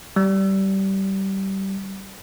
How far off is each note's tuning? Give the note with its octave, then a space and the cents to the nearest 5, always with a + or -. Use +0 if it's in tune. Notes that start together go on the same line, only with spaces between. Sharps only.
G3 -20